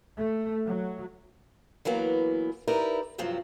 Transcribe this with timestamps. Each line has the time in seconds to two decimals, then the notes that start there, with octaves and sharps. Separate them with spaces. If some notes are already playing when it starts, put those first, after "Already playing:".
0.17 A3
0.66 F#3
1.85 E3 F#3 A#3 B3
2.67 D#4 E4 G4 A#4 B4 D5
3.18 G2 C3 F3 F#3 C4